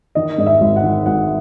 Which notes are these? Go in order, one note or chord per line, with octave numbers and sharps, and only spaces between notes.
D#3 D#5
G#2 D#5
E5
G#1
F#5
D#3
G#1 F#5